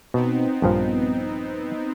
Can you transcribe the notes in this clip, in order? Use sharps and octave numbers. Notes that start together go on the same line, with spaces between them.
B2 B3 C4 D#4
A#1 G2 F3